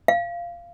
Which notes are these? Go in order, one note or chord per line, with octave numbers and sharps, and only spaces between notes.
F5